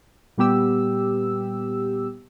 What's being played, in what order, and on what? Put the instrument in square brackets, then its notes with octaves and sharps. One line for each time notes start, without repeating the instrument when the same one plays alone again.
[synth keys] A#2 G3 B3 G4 E6